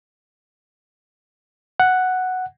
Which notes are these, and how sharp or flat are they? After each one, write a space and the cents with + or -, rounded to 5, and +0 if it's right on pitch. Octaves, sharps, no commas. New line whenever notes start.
F#5 +0